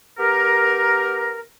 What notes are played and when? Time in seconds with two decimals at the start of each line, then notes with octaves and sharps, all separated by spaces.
0.18 B3 G4 A#4